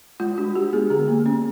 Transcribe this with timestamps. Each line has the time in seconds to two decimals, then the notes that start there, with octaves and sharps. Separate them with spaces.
0.20 G#3 F4
0.38 D4 F#4
0.56 G#3 G4
0.73 B3 G#4
0.90 D3 G#4
1.08 A#3
1.26 C#4